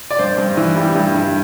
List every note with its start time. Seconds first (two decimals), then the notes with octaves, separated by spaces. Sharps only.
0.11 D5
0.19 G2 C5
0.38 G2
0.57 E3
0.76 G3
0.95 G2
1.14 G2